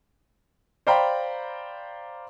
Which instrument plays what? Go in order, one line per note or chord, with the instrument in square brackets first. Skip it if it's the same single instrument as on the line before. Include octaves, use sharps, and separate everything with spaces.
[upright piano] C5 D5 F5 G5 A#5 B5